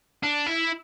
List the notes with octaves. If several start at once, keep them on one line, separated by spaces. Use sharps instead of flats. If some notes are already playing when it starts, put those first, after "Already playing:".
D4
E4